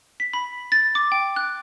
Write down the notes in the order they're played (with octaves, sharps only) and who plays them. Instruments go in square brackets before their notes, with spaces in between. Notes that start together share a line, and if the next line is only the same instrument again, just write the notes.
[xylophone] B6
B5
A6
D6
G5
F#6